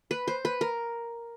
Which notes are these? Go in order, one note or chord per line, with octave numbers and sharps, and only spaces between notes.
B4
C5
B4
A#4